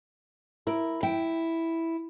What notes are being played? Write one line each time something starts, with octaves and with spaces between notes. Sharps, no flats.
E4 A#4
E4 G5